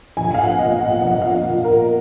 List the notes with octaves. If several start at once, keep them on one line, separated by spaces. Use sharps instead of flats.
A#1 G#5
F5
F#5
A#2 D#5
F#5
A#1 F#5
D#5
F5
A#2
A#4